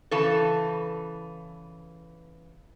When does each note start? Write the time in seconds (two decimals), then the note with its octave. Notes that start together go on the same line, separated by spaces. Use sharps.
0.11 C#3 E3 A4